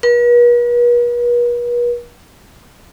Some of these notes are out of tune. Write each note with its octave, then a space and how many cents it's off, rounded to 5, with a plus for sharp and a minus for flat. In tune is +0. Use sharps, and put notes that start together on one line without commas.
B4 -45